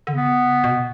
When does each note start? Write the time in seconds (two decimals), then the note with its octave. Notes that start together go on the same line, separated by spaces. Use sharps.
0.07 D3
0.13 C#3 B3
0.64 B2